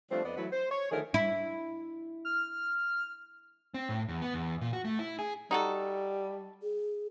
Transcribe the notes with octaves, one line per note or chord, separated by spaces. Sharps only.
F3 G3 A3 C4 D4 F4
F2 B3 D5 D#5
E3 F#3 A3 E4 B4
C5
C#5
D3 D#3 F3 A3 G#4 A#4
E4
F6
C4
A2
E2
B3
E2
A#2
F#4
A3
E4
G#4
G3 D#4 F#4 A4
G#4